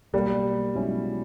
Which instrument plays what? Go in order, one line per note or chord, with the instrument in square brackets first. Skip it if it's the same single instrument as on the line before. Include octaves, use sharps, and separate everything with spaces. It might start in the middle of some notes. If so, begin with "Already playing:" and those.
[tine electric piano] B1 B2 A#3 [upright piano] G3
[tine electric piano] B1 B2 G#3 C#4 E4